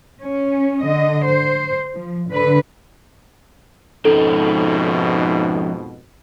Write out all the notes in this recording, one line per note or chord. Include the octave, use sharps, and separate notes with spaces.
C#4
D3 D#5
C5
F3
D3 B4
F2 G#2 B2 F3 C#4 D#4 A4